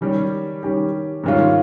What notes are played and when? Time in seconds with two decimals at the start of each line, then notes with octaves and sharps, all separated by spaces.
0.01 D#3 G3 C#4 G4
0.63 D#3 G3 C#4 G4
1.24 G#2 D#3 G3 C#4 F4